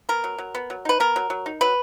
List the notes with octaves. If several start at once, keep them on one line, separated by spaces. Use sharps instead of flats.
B3 A#4
F#3
F#3
B3
F#3
D#4 B4
B3 A#4
F#3
F#3
D#4
F#3 B4